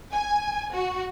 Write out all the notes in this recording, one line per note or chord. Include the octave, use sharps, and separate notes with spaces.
G#5
F#4